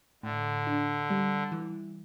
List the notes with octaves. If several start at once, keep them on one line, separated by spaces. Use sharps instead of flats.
A2 D3
D4
G3
E3